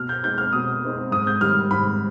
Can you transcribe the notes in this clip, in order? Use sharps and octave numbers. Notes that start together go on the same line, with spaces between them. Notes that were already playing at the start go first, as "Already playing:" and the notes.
Already playing: B2 F6
G6
G#3 C4 D#4 G6
F6
B2 D#6
G#3 C4 D#4
G#2 D#6
G6
D#3 G3 F6
G#2 B5